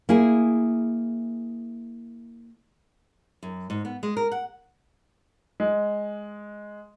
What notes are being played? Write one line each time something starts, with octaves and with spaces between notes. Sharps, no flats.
A#3 E4 G#4
F#2
G#2
B3
G#3
A#4
F#5
G#3